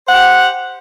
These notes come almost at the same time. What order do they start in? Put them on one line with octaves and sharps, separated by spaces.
C5 F#5 G4